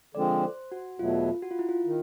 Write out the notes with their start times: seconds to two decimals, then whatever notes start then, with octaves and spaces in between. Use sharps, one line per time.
0.15 D3 F3 G#3 C4 D5
0.43 C5
0.72 F#4
0.99 E2 B2 F#3 A3 F4
1.42 F#4
1.51 F4
1.59 E4
1.69 F4
1.86 D#3